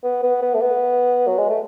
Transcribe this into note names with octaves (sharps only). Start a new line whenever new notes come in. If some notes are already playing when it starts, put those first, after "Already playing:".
B3
B3
B3
A3
B3
F#3
G#3
A3